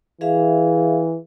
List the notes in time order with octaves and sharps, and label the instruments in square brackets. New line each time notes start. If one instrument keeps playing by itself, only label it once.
[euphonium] E3 [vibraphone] G#4 E5 F5